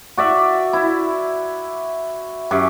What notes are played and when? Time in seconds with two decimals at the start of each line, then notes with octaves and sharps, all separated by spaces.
0.18 F#4 D5 E5
0.73 E4
2.51 F#2 G4